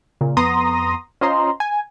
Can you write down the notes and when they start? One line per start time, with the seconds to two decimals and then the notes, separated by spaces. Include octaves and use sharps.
0.21 A#2 C#3
0.37 F2 B3 A#5 C6 D#6 A#6
1.21 C#4 F4 C5 D#5 A#5 C6
1.60 G#5